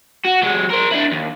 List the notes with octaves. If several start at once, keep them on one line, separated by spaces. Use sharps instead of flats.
F#4
F#3 G#3
A#4 C5
D4 E4
D#2